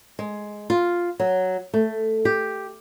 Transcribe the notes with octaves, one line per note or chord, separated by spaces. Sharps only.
G#3
F4
F#3
A3
G4